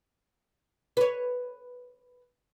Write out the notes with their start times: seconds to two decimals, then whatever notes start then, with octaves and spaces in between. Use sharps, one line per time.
0.97 B4 C#5